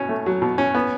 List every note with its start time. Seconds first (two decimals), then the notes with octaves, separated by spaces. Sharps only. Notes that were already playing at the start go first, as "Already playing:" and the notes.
Already playing: B2 C#4
0.09 A3
0.26 F#3
0.42 B2
0.58 C#4
0.75 B3